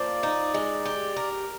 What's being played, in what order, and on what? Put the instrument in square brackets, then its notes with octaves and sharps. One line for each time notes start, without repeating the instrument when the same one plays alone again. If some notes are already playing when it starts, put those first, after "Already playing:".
Already playing: [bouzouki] F3 A#3 [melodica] D5
[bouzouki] D#4
G#3
G4
A#4